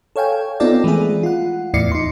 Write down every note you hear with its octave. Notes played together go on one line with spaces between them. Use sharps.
A4 C#5 F5 G5 G#5
B3 C4 D#4 F4 A4 D5
E3 G#3 A3 E4 G#4
F4 F#5
E2 A2 E4 D5 C7 C#7
D#4 C6